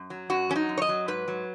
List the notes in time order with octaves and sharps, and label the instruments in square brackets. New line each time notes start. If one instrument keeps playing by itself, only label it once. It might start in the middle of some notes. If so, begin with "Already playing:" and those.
Already playing: [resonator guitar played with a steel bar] F#2
F#3
F#2 F#4
F#3 C#4
D#4
F#2
C#5
D#5
F#3
G#2 B4
F#3